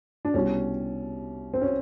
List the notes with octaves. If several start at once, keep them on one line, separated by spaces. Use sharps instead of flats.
D4
C2 B2 G3 C#4
C4
C#4